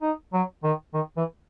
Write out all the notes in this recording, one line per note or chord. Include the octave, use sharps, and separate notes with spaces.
D#4
F#3
D#3
D#3
E3